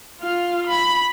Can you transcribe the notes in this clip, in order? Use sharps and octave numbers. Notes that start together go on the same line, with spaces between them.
F4 F6
B5